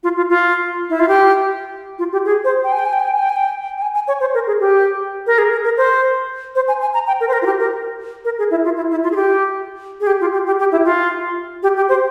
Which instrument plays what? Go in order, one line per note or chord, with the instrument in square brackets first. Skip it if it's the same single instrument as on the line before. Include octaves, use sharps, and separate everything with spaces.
[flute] F4
F4
F4
E4
F4
G4
F4
G4
G#4
C5
G5
G#5
G5
G#5
G5
G#5
G5
G#5
G5
G#5
G5
G5
G#5
G#5
C#5
C5
A#4
G#4
G4
A#4
G#4
A#4
A#4
C5
C5
G#5
G#5
A#5
G5
A#4
C5
A#4
F4
G4
A#4
A#4
G#4
E4
F4
E4
E4
F4
G#4
G4
G#4
G4
F4
G4
G4
G4
E4
F4
G4
G4
C5